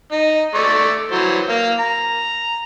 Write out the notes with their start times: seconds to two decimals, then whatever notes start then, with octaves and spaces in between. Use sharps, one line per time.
0.12 D#4
0.55 A3 D5 C#6
1.11 E3 F#3 C5
1.49 A#3 F5
1.79 A#5